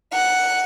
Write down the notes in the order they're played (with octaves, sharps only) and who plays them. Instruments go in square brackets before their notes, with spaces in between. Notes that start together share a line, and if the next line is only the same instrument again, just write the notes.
[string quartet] F#5